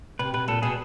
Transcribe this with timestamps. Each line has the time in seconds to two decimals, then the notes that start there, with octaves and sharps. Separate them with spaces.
0.19 C3 B4
0.34 B2 B4
0.48 A#2 A4
0.62 B2 G#4